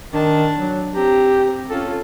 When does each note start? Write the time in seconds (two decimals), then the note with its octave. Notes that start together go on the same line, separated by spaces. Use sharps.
0.13 D#3 D4 A5
0.54 F#3
0.95 C4 G4 A#5
1.70 C#4 F4 A4